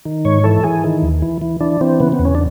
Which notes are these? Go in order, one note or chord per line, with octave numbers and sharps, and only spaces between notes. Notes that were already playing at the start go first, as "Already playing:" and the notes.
D#3
G#2 C#5
E3 A4
E3 G#4
D#3
D#2
E3
E3
E3 D4
E3 C4
C#3 B3
B3
E2
C#4
D4